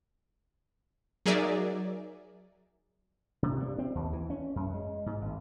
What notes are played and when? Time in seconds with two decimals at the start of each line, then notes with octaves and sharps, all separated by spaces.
1.26 F#3 D#4 G#4 A#4 D5 E5
3.43 C3
3.60 G2
3.78 C4
3.95 D#2
4.13 E3
4.30 C#4
4.56 F#2
4.74 G#3
5.06 G#2
5.22 G#1